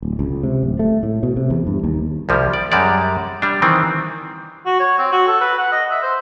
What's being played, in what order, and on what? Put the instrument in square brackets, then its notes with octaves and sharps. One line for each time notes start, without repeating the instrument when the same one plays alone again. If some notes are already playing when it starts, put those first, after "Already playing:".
[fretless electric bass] D1
C#2
C3
D1
A3
A2
B2
C3
E2
G2
D#2
[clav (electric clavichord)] C2 F3 G3
D5
F#2 G3 G#3 D5
G3 D4
D#3 E3 C4
[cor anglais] F#4
C#5
C4
F#4
A4
B4
F#5
D#5
E5
C5